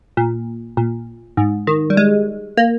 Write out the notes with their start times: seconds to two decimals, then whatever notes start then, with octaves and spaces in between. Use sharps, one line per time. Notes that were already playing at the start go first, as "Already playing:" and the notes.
0.17 A#2
0.77 A#2
1.37 G#2
1.67 D#3
1.90 G3
1.97 G#3
2.57 A#3